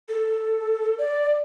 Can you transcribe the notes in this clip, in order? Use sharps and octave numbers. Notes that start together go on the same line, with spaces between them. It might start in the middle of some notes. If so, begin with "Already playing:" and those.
A4
D5